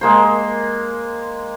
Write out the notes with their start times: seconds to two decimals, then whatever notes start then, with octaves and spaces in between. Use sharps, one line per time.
0.01 G#3 A#3 C5